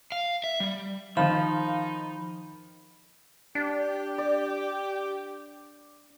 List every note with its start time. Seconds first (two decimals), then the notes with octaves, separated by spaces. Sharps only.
0.12 F5
0.44 E5
0.60 G3
1.17 D#3 F3 D#4 F5 B5
3.55 D4 G4
4.18 D5